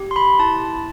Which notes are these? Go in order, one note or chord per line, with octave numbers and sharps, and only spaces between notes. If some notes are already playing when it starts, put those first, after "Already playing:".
Already playing: G4
C6
B5
E4 A5